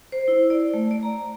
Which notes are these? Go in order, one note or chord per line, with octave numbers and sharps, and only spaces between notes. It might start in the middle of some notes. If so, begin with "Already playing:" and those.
C5
E4
D5
A3
D5
A#5